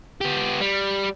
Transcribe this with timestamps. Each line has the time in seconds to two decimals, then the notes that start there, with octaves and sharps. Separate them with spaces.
0.21 B3 G4
0.61 G3